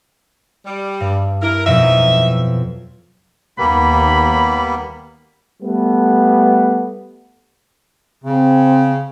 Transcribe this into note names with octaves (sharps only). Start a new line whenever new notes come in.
G3
G2
E4 A#4
F2 B2 F#3 D#4 E5
D#2 G3 A#3 B3 B5
G3 A3 B3
C#3 C4